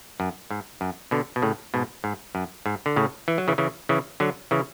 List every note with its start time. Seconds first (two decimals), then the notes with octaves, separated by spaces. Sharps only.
0.20 F#2
0.51 G#2
0.81 F#2
1.11 B2 D3
1.36 B2
1.42 A2 C#3
1.74 G#2 B2
2.04 G#2
2.35 F#2
2.66 G#2
2.86 D3
2.96 A2 C#3
3.28 E3
3.38 F#3
3.48 C#3 E3
3.58 C#3 E3
3.89 C#3 E3
4.20 D3 F#3
4.51 C#3 E3